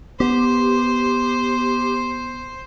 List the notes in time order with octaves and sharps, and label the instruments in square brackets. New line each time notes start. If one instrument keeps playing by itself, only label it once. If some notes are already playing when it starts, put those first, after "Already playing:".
[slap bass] B3 [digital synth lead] G4 [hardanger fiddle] C5